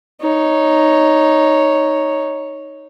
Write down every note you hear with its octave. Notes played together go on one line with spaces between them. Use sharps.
D#4 C#5